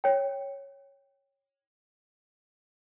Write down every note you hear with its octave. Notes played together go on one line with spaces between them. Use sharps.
C#5 G5